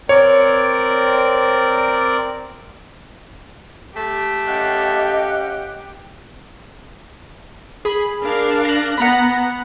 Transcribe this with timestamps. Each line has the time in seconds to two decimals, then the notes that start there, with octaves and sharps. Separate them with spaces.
0.09 C4 A#4 C#5 D5
3.96 A3 G4
4.47 C#4 D#5 F5 F#5
7.85 G#4 B5
8.22 D4 A#4 F5
8.65 F#6 A#6
8.98 B3 F#5 A#5 B5